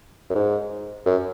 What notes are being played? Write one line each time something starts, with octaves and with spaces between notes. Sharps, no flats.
F#2
G#2
F#2